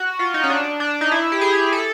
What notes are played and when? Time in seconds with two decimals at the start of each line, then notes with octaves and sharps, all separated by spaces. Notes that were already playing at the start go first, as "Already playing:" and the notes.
Already playing: F#4
0.19 F4
0.34 D#4
0.44 C#4
0.50 D4
0.80 D4
1.01 D#4
1.11 E4
1.32 G4
1.41 G#4
1.73 A4